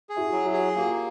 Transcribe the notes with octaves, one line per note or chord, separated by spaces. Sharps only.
G#4
E4 F#4
F#3
E4 F#4
G#4
A#3 F4 G4